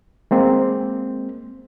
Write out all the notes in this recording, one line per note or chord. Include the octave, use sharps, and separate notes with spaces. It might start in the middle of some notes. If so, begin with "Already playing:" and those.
G#3 A#3 C4